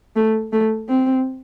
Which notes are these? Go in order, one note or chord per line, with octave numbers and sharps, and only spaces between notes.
A3
A3
C4